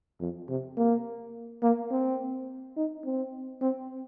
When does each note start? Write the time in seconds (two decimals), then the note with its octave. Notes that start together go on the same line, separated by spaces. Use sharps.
0.20 F2
0.49 C3
0.77 A#3
1.62 A#3
1.91 C4
2.77 D#4
3.05 C4
3.61 C4